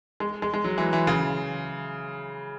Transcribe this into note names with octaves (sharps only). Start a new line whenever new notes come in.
G#3
G#3
G#3
F#3
E3
E3
C#3